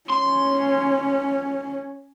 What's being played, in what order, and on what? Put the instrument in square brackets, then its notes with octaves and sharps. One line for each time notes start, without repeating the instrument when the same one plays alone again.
[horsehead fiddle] C#4 [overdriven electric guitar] C6